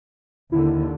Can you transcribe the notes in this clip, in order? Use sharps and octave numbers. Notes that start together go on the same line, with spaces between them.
D#2 D3 E4